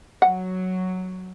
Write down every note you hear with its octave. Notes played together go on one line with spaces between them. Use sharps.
F#3 F#5